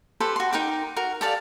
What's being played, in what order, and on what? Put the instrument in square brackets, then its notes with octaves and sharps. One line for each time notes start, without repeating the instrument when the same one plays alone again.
[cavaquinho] G4 A4 B4 C5
F#4 C6
D#4 A#4 G5 D6
F#4 A#4
G4 A4 D5 F5